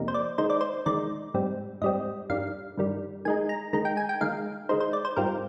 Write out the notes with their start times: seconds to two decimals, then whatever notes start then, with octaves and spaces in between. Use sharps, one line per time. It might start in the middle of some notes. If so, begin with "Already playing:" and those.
Already playing: F2 C3 G3 A#3 D#4
0.08 C5
0.14 D5
0.38 D#3 G#3 D#4 C5
0.50 D5
0.61 C5
0.86 D#3 G#3 D#4 D5
1.34 G#2 G3 C4
1.82 G#2 G3 C4 D#5
2.30 G2 D#3 G3 F5
2.78 G2 D#3 G3
3.25 D#3 G#3 D#4 G#5
3.49 A#5
3.73 D#3 G#3 D#4 A#5
3.85 G5
3.97 G#5
4.09 G5
4.21 D#3 G#3 D#4 F5
4.69 D#3 G#3 D#4 C5
4.80 C5
4.93 D5
5.05 C5
5.16 G#2 G3 C4 F4 A#4